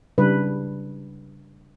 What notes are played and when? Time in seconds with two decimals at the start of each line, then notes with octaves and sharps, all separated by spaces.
0.18 C#3 G3 D4 B4